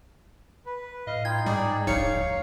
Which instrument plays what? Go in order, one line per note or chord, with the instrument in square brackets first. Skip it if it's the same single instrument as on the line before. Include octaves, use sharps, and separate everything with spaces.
[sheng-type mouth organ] B4
[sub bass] A2 [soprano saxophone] D#5 [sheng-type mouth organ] F5
[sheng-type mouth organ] D#4 F4 [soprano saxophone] G5 [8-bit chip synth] G#6
[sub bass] G#2 [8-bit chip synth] G3 [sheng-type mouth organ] D#4 G#4 D5
[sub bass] D1 [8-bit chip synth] A#1 D#4 C#7 [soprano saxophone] C#5 [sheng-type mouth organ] F5
[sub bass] D2